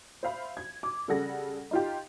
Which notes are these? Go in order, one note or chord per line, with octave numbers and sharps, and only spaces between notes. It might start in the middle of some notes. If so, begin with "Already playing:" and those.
C5 E5 F5 B5
G#6
D6
C#3 G3 A4 F#5 A#6
D#4 F4 G4